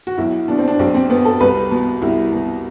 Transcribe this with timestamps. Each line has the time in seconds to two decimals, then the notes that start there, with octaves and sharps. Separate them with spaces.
0.07 F#4
0.18 B1 E4
0.48 B2 D4
0.59 C4
0.68 D4
0.79 B1 C4
0.94 C4
1.10 B2 B3
1.25 A4
1.40 C2 B4
1.71 B2
2.02 C2 E4
2.32 B2